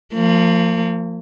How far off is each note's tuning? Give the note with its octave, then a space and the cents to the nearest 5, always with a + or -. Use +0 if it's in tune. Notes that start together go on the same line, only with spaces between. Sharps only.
F3 +0 A#3 -40